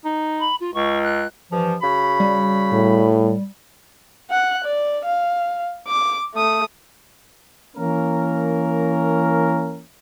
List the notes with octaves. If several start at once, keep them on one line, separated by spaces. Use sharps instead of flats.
D#4
B5
F4
C#2 C#6
F#6
G2 E3 F3
C#3 F#4 B5
G3
A2
F#5 F#6
D5
F5
D6
A3 D#6
E3 A#3 C#4 A#4